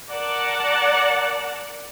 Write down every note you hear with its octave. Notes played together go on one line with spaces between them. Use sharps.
A#4 D5 F#5 A5